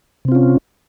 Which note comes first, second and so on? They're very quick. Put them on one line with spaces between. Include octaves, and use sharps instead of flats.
C3 C4 F4 C#4